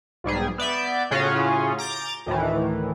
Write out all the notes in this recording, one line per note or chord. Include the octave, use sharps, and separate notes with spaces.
B1 G#2 G3 G#4
B3 D5 E5 G6
A2 C#3 C#4 F4 F#4 G#4
A#5 D6 G6 A6
D2 A2 D#3 E3